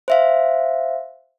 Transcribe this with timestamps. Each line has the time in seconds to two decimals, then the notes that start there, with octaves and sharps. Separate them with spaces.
0.08 C5 E5 F5